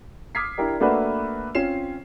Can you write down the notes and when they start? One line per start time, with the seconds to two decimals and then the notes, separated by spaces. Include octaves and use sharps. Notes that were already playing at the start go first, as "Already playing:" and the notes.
0.35 D6 D#6 F6 G#6 B6 C7
0.58 D4 E4 G4 A#4 D5
0.80 A3 A#3 D4 F#4 B4 E5
1.55 C4 C#4 F4 C7 E7